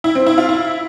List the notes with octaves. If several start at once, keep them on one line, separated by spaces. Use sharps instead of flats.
E4
C4
E4
F4
E4